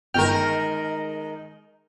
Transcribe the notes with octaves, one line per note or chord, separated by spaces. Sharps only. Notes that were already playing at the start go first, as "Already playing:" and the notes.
G1 D#3 G#3 A#4 G5 F6